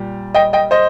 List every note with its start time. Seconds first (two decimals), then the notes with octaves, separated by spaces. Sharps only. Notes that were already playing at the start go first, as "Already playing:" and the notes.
Already playing: A#2 G3
0.34 D#5 G5
0.53 D#5 G5
0.71 C5 D#5